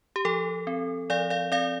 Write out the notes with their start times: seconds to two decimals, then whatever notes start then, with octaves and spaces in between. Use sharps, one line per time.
0.16 G4
0.25 F3 A4
0.67 C4
1.10 F3 D5 F5
1.30 D5 F5
1.52 C4 D5 F5